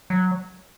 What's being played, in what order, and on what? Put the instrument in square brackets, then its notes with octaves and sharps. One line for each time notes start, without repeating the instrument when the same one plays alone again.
[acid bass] F#3